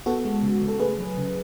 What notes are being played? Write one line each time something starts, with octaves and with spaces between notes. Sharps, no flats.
B3 F#4 A4
G#3
C#3
C#3
A4
A3 G#4 B4
F#3
C#3